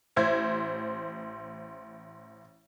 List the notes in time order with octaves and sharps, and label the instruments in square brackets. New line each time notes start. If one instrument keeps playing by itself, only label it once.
[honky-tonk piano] A1 C5 E5 G#6